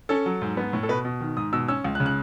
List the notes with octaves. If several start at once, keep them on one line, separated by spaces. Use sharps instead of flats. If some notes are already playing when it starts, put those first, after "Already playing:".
C#4 A4
F#3
G#2
B3
A2
A4
B2 B4
B2
D#3
G#2 D#6
B2 E6
C#4 E6
C#2
F#6
C#3
F#6